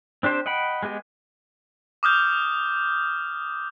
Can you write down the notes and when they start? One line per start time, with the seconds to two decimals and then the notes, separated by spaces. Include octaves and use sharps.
0.23 C4 D4 G4 C5
0.46 D#5 F#5 G5 B5
0.83 G#3 B3 G4 D#5
2.03 D6 D#6 F6 G6